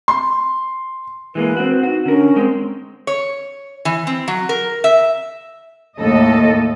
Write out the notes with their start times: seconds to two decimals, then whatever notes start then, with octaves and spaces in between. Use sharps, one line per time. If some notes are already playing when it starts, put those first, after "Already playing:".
0.08 C6
1.35 E3 G#3 A#3 B4
1.57 C4 F#4
1.83 D#4 F#4
2.06 D3 C#4 A#4
2.36 G#3 C4
3.07 C#5
3.85 E3
4.07 C4
4.28 F#3
4.49 A#4
4.84 E5
5.98 D#2 A2 A4 D#5